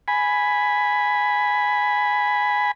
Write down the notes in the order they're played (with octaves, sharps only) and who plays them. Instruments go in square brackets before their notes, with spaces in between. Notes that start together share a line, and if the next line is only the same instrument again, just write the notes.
[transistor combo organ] G#5 B5